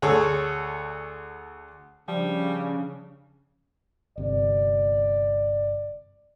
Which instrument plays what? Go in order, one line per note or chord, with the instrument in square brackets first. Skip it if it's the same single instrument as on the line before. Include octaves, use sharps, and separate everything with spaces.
[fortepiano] D2 G#4 A4 C#5
[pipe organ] C#3 [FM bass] F3 [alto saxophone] G3 [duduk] D4
[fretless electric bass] G1 C3 [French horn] D5